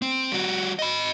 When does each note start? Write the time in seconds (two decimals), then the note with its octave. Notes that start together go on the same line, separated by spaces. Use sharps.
0.02 C4
0.32 G3 F#4
0.79 D#5 B5